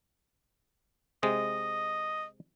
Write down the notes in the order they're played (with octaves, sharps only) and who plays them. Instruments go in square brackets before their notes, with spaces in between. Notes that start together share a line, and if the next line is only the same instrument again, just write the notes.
[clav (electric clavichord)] C3 G#3 [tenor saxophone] D#5